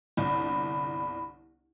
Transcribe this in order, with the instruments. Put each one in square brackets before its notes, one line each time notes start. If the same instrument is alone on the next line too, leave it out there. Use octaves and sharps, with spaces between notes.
[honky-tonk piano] G1 C2 [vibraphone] B5